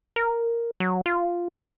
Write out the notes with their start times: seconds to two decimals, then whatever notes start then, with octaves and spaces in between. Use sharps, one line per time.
0.16 A#4
0.80 F#3
1.06 F4